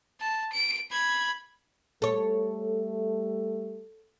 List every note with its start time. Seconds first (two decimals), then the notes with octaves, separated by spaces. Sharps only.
0.21 A5
0.53 D7
0.91 B5 G#6
2.02 G3 A3 A4 C#5